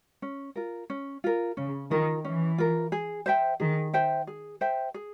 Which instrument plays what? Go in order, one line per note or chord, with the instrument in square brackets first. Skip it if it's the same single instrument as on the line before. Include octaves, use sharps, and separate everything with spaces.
[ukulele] C#4
F4 A#4
C#4
F4 A#4
[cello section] C#3 [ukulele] C#4
[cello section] D#3 [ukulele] F4 A#4
[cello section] E3 [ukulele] C#4
[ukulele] F4 A#4
G#4
C5 E5 G5
[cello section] D#3 [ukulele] G#4
[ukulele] C5 E5 G5
G#4
C5 E5 G5
G#4